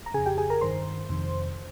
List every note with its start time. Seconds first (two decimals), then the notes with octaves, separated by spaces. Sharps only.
0.06 A#5
0.14 F2 C#3 G#4 G#5
0.26 G4 G5
0.38 G#4 G#5
0.50 A#4 A#5
0.61 G2 D#3 C5 C6
1.09 F2 C3 D#3